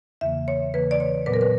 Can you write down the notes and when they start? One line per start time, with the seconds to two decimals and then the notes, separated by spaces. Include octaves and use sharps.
0.21 E2 C#3 E3 A#3 E5
0.48 C#5
0.73 E2 C#3 E3 A#3 B4
0.91 D5
1.00 C#5
1.26 A#2 F#3 B3 B4
1.34 A#4
1.41 B4